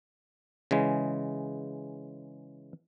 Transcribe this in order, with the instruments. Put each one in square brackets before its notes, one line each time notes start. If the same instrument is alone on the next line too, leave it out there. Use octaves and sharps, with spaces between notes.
[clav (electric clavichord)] C#3 E3 G#3